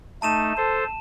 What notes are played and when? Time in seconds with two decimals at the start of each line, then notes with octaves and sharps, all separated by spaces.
0.22 A3 D#4 A5 D#7 E7
0.57 A4 C5